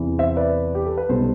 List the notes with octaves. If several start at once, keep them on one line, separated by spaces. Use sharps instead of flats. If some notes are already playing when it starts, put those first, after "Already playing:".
Already playing: E2 C3 E3
C5 E5
B4 D5
G4
A4
B4
B1 B2 G3 B3 A4 C5